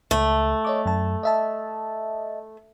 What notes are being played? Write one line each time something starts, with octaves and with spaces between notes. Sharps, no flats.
C#2 A3
C#5 D#5 D6
F#2 A5
D#5 E5 A5